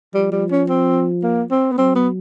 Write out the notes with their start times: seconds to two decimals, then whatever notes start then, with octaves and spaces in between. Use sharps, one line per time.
0.14 F3 G3
0.32 G3
0.51 C#4
0.69 C4
1.23 A#3
1.51 C4
1.72 B3
1.78 F#3 C4
1.95 B3